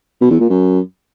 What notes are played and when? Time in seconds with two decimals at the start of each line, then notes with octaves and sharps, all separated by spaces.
0.21 B2
0.31 E2
0.40 A#2
0.50 F#2